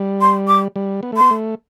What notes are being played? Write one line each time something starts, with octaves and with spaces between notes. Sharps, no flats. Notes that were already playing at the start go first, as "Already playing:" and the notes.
Already playing: G3
C6
D6
G3
B3
A3
B3 C6
A3